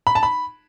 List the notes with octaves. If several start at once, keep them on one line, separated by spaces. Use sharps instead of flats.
B5
A5
B5